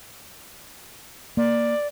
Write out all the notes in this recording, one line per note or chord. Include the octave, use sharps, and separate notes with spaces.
A#3 D5